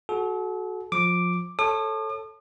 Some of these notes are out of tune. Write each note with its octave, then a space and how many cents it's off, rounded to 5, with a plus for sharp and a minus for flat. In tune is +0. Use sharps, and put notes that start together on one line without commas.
F#4 +0 A4 -40
F3 +20 D6 +0
A4 +0 C#5 -20 D#6 -45